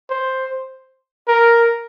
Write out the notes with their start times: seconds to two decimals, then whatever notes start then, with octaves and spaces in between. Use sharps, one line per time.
0.10 C5
1.28 A#4